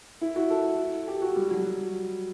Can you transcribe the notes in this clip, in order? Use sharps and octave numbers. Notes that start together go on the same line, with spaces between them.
E4
F#4
A4
G4
F#4
G3
F#3